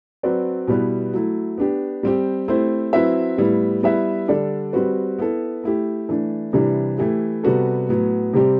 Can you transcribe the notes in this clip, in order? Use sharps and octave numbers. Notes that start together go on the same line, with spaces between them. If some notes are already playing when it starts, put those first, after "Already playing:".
F#3 C4 F#4 B4 D5
B2 G3 B3 E4 B4
F#3 A3 E4
B3 D4 G4
G3 C4 G4
A3 C4 E4 G4 C5
F#3 C4 E4 B4 E5
A2 G3 B3 E4
G3 B3 E4 B4 E5
D3 G3 D4 A4 D5
G3 C4 F#4 B4
B3 E4 A4
A3 E4 G4
E3 A3 D4
C3 E3 G3 D4
E3 A3 E4 G4
C3 G3 B3 F#4 A4
A2 F#3 B3
C3 G3 C4 G4